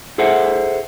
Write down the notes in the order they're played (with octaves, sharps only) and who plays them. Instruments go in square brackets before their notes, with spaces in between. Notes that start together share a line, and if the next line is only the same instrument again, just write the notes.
[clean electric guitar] G#4 A4 C5 E5 F#5